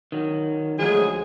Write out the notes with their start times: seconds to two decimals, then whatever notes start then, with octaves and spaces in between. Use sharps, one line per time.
0.12 D#3 F#3
0.79 D2 F3 F#3 G#3 G#4